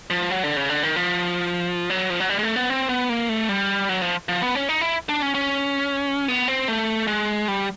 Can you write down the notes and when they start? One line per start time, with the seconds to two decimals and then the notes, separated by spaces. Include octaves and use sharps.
0.10 F3
0.30 F#3
0.43 D3
0.56 C#3
0.69 D3
0.83 D#3
0.96 F3
1.90 F#3
2.10 F3
2.20 F#3
2.29 G3
2.39 G#3
2.43 A3
2.56 B3
2.70 C4
2.89 B3
3.09 A#3
3.29 A3
3.49 G3
3.89 F#3
4.02 F3
4.29 F3
4.42 B3
4.55 C#4
4.69 D#4
4.81 E4
5.09 D4
5.22 C#4
5.35 C#4
6.28 B3
6.48 C4
6.68 A3
7.07 G#3
7.48 G3